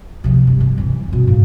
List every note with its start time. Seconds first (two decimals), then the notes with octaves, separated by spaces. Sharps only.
0.24 C3 F3
0.47 G2 D#3
0.60 C3
0.78 E3 C4
1.08 G2 B2
1.27 G#2 A#3